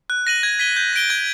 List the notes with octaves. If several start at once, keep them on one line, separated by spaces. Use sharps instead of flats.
F#6
A#6 D#7 F#7
G#6
B6 D#7 G7
G6
A#6 D7 G7
G#6